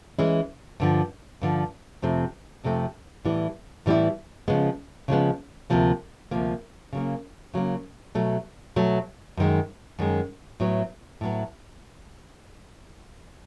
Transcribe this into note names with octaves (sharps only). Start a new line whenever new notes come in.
E3 G#3 C#4 E4
G2 D3 F3
G2 D3 F3
F2 C3 F3 A3 C4
F2 C3 F3 A3 C4
A2 E3 G3 B3 E4
A2 E3 G3 B3 E4
C#3 F3 G#3 B3
C#3 F3 G#3 B3
D2 C3 F3 A#3
D2 C3 F3 A#3
C#3 F#3 A#3
C#3 F#3 A#3
B2 F#3 A3
B2 F#3 A3
F#2 D#3 G#3
F#2 D#3 G#3
A2 F#3 B3
A2 F#3 B3